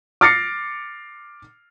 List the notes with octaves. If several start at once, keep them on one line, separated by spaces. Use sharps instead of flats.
D6 F6 A6 A#6 C7 C#7